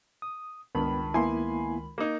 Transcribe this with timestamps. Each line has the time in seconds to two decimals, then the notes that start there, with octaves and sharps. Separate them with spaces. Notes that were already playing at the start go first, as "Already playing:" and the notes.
0.22 D#6
0.75 C#2 G2 D#3 B3 B5
1.14 A#3 B3 E4 G#5 C6
1.98 A#3 D#4